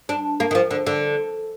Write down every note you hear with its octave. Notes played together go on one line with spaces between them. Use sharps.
D4
A#3
D#3
F3
D3
D3